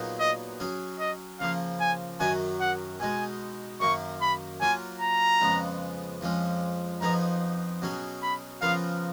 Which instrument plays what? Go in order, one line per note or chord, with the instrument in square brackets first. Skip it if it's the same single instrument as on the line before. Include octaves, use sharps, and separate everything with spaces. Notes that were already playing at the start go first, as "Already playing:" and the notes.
Already playing: [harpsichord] A#2 F#3 B3 D#4 G#4
[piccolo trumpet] D#5
[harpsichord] F#3 C#4 G#4
[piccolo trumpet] D#5
[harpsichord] C#3 F3 A#3 [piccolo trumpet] F5
[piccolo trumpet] G#5
[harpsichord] F#2 D#3 F#3 C#4 F#4 [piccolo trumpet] G#5
[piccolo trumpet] F#5
[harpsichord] B2 G#3 D#4 [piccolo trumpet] G#5
[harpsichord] F#2 D#3 A#3 [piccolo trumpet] C#6
[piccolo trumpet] B5
[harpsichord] F#3 A#3 F4 [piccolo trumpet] G#5
[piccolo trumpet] A#5
[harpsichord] F2 C#3 G#3 B3
F2 F3 G#3 C#4
[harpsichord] F2 F3 B3 D#4 G#4 [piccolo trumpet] A#5
[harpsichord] B2 F#3 C#4 G#4
[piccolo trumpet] B5
[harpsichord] C#3 F3 B3 F4 A#4 [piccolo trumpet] F5